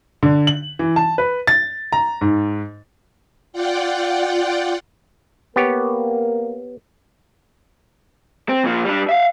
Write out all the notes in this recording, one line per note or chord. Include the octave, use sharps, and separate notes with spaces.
D3
F#7
E3
A5
B4
A6
A#5
G#2
F4 D5 F#5 G5
A#3 B3 G4 A#4 C#5
C4
A#2 F3
G3 D4
E5 F5